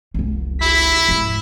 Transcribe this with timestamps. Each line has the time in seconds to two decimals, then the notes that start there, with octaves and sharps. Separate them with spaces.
0.14 F1 C2
0.62 E4 B6
1.09 D2 G#2